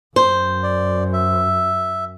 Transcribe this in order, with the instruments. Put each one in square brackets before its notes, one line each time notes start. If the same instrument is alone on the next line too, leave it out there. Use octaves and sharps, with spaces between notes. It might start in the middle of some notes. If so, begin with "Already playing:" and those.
[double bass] F#2 [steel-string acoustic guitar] C5
[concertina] D5
E5